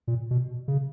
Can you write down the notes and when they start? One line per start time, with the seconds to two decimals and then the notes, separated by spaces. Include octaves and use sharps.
0.08 A#2
0.31 B2
0.68 C#3